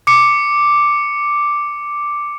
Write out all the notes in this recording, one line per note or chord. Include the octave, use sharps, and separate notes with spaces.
D6 C#7